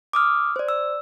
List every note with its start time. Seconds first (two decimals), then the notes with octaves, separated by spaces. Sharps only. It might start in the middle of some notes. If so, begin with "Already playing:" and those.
0.13 D6 D#6 F6
0.56 C5 D5
0.68 E6